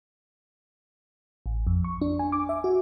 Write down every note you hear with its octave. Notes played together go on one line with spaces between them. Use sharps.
A1
F2
C#6
D4
G#5
D6
E5
F#4